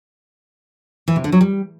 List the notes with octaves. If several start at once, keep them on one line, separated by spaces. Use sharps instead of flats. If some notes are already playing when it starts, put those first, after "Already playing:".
E3
C3
D3
F#3
G3